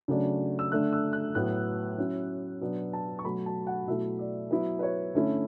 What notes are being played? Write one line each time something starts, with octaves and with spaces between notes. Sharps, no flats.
C#3 F#3 A3 D4
E6
D3 A3 D4 F#6
E6
F#6
A2 F#3 B3 F#6
F#3 C#4 E4
B2 F#3 B3 D4
A5
C#6
B2 F#3 A3 B5
A5
F#5
B2 F#3 A3 E4 E5
D5
F#3 B3 E4 B4
B4
C#5
D3 A3 C#4 E4